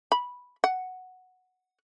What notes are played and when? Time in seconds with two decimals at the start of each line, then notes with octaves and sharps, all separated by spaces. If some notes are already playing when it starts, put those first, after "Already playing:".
0.12 B5
0.64 F#5